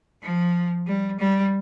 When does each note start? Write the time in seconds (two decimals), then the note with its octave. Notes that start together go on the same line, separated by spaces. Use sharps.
0.22 F3
0.87 G3
1.19 G3